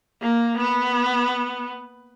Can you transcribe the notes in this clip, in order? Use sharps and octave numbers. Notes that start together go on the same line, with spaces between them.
A#3
B3